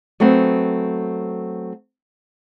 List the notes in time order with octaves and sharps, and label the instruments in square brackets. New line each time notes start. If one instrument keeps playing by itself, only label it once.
[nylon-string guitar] F#3 A3 B3 C4 F#5